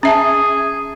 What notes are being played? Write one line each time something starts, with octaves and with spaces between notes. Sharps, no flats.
C#4 G#4 E5 A5